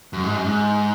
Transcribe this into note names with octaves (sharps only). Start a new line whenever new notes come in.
F#2
G#2
F#2
G#2